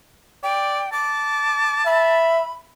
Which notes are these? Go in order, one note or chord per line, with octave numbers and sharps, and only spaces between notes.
D5 G5
A5 D6
E5 B5